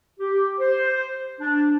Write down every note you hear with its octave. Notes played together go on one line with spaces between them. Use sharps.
G4
C5
D4